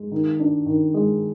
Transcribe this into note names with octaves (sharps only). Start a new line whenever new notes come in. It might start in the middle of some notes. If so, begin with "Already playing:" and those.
Already playing: G#3
D#3
D4
D#3
G#3